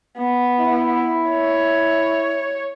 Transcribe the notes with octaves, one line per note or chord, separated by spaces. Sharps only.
B3
E4
C#5